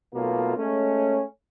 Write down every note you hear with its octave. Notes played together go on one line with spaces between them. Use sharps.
B1 B2 A3 A#3 F4
G#3 A3 C#4